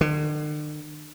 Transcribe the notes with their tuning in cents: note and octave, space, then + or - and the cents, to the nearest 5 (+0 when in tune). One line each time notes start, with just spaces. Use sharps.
D3 +45